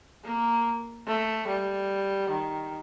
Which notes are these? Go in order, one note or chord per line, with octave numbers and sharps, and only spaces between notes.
A#3
A3
G3
D#3